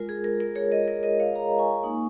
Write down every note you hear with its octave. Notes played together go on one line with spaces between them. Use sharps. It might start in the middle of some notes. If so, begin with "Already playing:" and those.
Already playing: G#3 F4 A#4
G#4
A#4
A#4
G#4 C#5
A#4 D#5
A#4
A#4 D#5
C#5 F5
F5 A#5
G#5 C#6
A#3 D#4